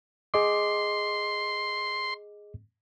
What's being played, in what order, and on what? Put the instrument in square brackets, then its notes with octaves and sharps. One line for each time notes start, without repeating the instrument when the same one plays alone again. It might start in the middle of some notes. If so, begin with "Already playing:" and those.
[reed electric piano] G#4 D#5 D6 [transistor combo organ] C6